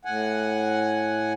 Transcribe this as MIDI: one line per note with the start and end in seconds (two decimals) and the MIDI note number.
0.05 1.33 45
0.05 1.33 78
0.05 1.33 80